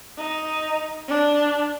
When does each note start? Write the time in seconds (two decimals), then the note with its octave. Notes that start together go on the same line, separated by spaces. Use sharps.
0.18 D#4
1.08 D4